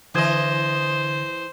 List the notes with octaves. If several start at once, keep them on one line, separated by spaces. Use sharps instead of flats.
D3 E3 C5 D#5 D#6 G#6